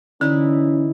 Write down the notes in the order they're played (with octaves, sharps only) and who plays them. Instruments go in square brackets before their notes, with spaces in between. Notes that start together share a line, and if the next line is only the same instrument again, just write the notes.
[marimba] D3 [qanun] E3 D#4 E4 [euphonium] C#4